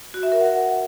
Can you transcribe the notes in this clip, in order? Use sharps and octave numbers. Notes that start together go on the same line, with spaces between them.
F#4
E5
A#4
F#5